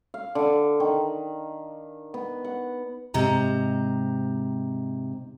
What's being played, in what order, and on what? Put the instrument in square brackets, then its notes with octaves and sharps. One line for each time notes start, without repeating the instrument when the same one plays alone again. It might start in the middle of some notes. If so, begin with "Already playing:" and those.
[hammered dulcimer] F5
D3
D#3
B3
F#5
[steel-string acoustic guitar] G#2 C3 A#5